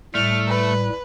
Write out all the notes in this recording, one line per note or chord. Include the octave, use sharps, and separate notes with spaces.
A2 G3 A3 F6
B4